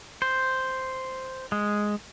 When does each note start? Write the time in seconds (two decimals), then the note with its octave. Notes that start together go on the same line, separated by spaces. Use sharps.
0.22 C5
1.52 G#3